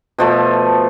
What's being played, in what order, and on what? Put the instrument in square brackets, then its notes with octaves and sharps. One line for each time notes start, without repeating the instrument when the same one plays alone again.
[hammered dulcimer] B2 F3 A3